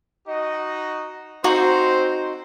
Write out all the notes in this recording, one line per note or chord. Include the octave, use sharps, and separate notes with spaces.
D#4 F#4 D#5
C4 D#4 F#4 C5